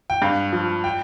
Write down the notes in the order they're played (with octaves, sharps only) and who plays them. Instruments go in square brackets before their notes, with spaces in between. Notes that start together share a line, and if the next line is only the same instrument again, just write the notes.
[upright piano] G5
G2 F5
F3
G5